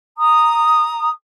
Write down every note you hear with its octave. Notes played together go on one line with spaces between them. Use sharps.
A#5 D#6